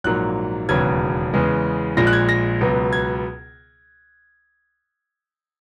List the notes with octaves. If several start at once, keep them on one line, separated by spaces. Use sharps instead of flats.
A#1 G#2 F#3 A#3 F#6
E1 D#2 C#3 F#3 B3 G#6
E2 C#3 G#3 B3
A#1 A#2 G#3 A#6
F#6
G#6
A#6
C#2 B2 F#3 B3
G#6